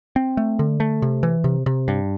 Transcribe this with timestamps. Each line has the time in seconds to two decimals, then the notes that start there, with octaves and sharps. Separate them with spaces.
0.16 C4
0.37 A3
0.59 D3
0.80 A3
1.02 C3
1.23 E3
1.44 C3
1.66 C3
1.88 G2